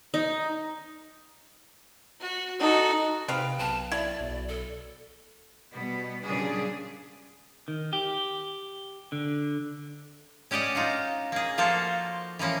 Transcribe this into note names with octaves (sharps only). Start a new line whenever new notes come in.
D#4
F#4
D#4 F#4 A4
C3 B4 C5 F5 G5
B1 A5
E4 D5
B1
A4
B2 G3 B3
A#2 C#3 F#3 G3 D4 G#4
D#3
G4
D3
C#4 G4 D5 D#5 F#5
D#4 F4 F#4
A#3 G#4
F3 A#3 F4 F#4 A4 C5
E3 F3 A#3 C#4